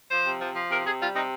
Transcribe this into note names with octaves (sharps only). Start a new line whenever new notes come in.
F3 C5
C3
F3
F3
C3 A#4
C3 G#4
G3 F4
C3 D#4